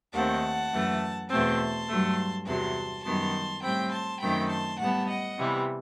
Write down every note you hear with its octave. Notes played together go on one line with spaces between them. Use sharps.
D#2 D#3 A3 C4 F#5 A5
F#2 E3 A3
E2 B2 A3 C4 A5 C6
G2 F#3 A3
E2 C3 F#3 A5 C6
F#2 D#3 G3 B3 A5 C6
A2 G3 C4 G5 B5
A5 C6
F#2 D#3 A3 C4 G5 B5
A5 C6
A2 G3 B3 F#5 A5
D#5 F#5
C3 E3 G3 B3